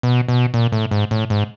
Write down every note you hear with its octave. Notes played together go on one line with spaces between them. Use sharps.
B2
B2
A#2
A2
G#2
A2
G#2